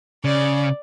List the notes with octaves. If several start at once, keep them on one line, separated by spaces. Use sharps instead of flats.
C#3 D5